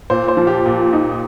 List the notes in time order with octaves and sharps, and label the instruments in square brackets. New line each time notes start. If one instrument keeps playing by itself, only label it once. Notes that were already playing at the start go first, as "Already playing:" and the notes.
[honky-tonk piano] A#2 [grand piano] C5
[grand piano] C5
[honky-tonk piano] F3
[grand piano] G4
[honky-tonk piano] A#2
D#4